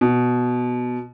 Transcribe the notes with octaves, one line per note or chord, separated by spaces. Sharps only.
B2